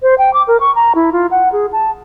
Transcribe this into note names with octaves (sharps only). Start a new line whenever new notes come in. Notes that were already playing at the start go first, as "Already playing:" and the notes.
C5
G5
D6
A#4
C#6
A#5
E4
F4
F#5
G#4
A5